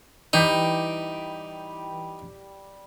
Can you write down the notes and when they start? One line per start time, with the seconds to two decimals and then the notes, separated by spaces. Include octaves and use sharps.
0.33 E3 G3 D#4 G4